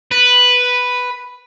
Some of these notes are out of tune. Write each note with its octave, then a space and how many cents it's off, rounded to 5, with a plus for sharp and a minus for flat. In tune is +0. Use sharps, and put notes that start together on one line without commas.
B4 +0